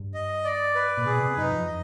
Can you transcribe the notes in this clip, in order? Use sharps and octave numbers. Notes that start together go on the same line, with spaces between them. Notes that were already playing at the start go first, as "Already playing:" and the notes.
Already playing: G2
D#5
D5
B4
A#2
B2 G#4
C3
F#2 D#4
F2
D#5